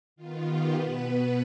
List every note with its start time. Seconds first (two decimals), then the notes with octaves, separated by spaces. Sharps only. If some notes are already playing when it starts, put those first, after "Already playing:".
0.16 D#3 B3 F4
0.45 G4
0.73 B2 B3 B4
1.02 B4